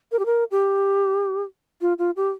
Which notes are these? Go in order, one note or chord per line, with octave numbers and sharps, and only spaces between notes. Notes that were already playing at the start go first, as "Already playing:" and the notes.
A#4
G4
A#4
G4
F4
F4
G4